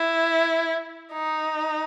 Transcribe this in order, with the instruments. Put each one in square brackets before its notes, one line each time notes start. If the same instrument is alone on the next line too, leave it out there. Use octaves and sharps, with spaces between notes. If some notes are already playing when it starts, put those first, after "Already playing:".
Already playing: [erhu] E4
D#4